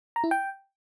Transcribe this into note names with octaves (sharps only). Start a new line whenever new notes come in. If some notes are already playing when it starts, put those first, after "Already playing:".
A#5
E4
G5